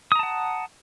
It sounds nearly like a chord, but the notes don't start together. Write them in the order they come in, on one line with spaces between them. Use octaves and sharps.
D#6 A#5 A5 F#5